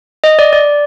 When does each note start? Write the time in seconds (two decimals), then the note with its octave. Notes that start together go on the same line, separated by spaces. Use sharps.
0.24 D#5
0.39 D5
0.53 D5